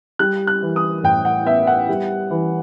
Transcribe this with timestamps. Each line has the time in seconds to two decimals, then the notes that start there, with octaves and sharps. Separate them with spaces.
0.19 G3 F#6
0.47 F#6
0.62 E3
0.76 D#6
1.03 A2 G5
1.25 F#5
1.46 B3 E5
1.67 F#5
1.89 G3
2.30 E3